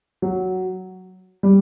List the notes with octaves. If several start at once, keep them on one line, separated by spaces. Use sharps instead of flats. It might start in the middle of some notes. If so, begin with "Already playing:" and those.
F#3
G3